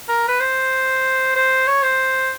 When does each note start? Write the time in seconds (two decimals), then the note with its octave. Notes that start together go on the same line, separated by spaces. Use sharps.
0.08 A#4
0.28 B4
0.40 C5
1.36 C5
1.67 C#5
1.82 C5